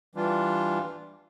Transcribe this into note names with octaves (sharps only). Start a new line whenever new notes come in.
E3 G3 D4 F4